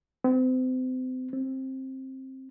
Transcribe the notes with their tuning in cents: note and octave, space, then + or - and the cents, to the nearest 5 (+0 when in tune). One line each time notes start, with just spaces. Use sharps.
C4 -35
C4 +15